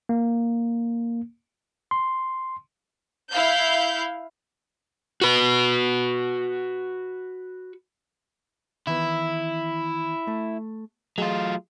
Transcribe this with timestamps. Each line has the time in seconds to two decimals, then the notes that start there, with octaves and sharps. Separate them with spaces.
0.09 A#3
1.91 C6
3.30 E4 F5 G6
5.21 F#4 B4
8.87 D#3 E3 B3 E4
10.27 A3
11.18 F#3 A3 F4 G#4 D#5